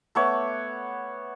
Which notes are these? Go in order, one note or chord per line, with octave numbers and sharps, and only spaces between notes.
A3 B3 C#5 D6